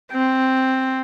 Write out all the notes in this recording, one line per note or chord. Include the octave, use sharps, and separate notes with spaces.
C4